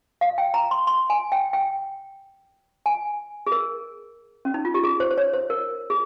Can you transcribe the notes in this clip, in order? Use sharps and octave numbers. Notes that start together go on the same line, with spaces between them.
F5
G5
A#5
C6
C6
G#5
G5
G5
G#5
G#4
A#4
C#4
D#4
F4
G4
G#4
C5
C5
C#5
C5
A#4
G#4